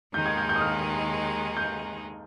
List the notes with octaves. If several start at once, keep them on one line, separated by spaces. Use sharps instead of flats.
D#2 D#3 G#3 D#4 G#4 G6
G#6
G6
G6
D#6
F6
G6